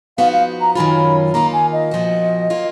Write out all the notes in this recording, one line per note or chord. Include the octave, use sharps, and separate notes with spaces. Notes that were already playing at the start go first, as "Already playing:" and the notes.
F3 B3 D#4 F#4 F5
F5
A#5
F#2 D#3 F#3 C#4 F4 B5
D#3 A#3 F4 A#5
G#5
D#5
A#2 F3 B3 F#4
F#3 A#3 F4